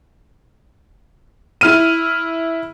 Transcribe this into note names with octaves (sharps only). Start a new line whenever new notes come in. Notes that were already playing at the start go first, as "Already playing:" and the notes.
E4 F6 D#7